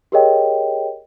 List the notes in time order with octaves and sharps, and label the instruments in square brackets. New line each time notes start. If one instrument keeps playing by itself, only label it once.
[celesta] G4 G#4 A#4 C#5 D#5 G5